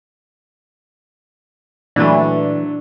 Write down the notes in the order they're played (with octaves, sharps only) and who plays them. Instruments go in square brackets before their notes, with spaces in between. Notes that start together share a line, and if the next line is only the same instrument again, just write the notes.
[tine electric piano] A#2 [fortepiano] D3 F#3 A3 [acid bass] E3 [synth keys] D4